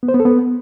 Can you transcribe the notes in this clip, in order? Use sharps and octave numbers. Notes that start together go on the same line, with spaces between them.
B3
C5
B3
A4
B3